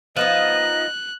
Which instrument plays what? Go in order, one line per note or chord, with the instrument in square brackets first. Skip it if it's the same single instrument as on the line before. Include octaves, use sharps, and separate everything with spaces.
[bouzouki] F3 B3 D#4 [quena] D#5 [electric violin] F#6